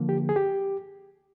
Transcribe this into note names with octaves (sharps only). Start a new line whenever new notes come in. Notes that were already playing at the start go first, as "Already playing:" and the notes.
Already playing: D3 F3 A#3
G4
G#4
G4